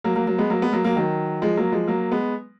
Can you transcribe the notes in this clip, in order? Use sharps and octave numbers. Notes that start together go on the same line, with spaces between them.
F#3 A#3
F#3 A#3
F#3 A#3
G#3 B3
F#3 A#3
G#3 B3
F#3 A#3
F#3 A#3
D#3 F#3
F3 G#3
F#3 A#3
F3 G#3
F#3 A#3
G#3 B3